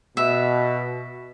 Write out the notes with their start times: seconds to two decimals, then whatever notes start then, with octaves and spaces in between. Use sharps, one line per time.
0.17 B2 E5